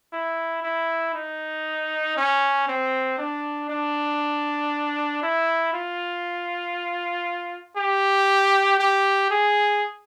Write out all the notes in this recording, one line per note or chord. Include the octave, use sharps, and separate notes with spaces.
E4
E4
D#4
C#4
C4
D4
D4
E4
F4
G4
G4
G#4